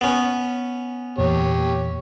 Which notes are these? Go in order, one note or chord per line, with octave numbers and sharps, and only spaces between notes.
B3 C#4
E2 A#2 G4 C#5